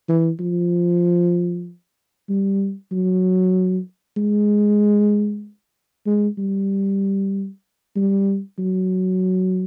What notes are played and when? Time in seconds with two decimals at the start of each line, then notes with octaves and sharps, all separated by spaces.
0.09 E3
0.40 F3
2.29 G3
2.91 F#3
4.17 G#3
6.06 G#3
6.38 G3
7.96 G3
8.59 F#3